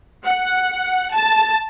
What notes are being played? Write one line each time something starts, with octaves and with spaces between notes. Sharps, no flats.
F#5
A5